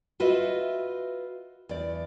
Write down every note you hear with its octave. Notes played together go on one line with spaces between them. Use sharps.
F4 F#4 B4 D#5 E5
E2 D5